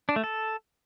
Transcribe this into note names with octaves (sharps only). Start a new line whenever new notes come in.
D4
A3
A4